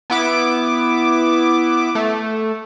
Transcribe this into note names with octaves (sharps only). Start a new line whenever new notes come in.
B3 E4 D6
A3